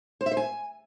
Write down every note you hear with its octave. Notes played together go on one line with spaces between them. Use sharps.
C5
E5
C5
G#5